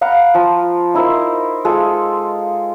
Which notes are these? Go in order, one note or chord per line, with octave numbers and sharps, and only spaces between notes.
F5 F#5 A#5 B5
F3
D#4 E4 A#4 C5
G#3 F4 A4